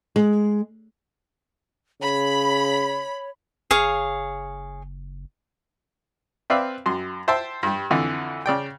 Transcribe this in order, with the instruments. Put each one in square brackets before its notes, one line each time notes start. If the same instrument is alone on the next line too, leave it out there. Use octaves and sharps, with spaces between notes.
[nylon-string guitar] G#3
[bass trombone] C#3 [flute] C#5 [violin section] B5
[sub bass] F#1 [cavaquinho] G#4 C#5 F5
[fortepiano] C4 B4 D5 E5 F5
F#2 C6
C5 E5 G5 A5 C6
G2 G3
F2 D3 E3
C#3 D5 G5